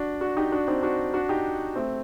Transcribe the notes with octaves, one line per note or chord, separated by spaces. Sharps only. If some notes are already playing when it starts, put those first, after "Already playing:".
Already playing: D4 F#4
D4 F#4
D#4 G4
D4 F#4
C4 D#4
D4 F#4
D4 F#4
D#4 G4
A3 C4